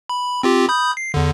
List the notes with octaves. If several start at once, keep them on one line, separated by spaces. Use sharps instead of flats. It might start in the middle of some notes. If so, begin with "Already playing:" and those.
B5
C4 F4 G4
B5 D#6 G6
C7
E2 D3